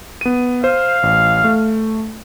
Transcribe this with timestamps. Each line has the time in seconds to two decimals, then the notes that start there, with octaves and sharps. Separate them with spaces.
0.21 B3 D#7
0.64 C5 F5
1.03 A1
1.44 A3